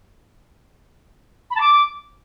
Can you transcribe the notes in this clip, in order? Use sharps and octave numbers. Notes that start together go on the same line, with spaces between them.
B5
A5
D6